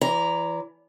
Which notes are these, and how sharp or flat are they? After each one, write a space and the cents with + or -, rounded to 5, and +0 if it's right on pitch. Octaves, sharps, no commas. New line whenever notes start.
E3 +25 D5 -30 A#5 +0